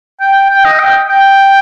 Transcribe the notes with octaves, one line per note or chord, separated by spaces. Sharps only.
G5
G5
D#5
G5
G5